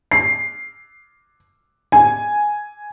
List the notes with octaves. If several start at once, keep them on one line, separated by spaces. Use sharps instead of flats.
C7
G#5